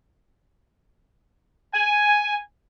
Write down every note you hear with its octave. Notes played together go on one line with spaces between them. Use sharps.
G#5